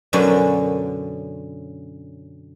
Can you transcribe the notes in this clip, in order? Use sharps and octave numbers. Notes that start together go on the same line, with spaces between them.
F#2 B2 D3 F#3 C#4 D4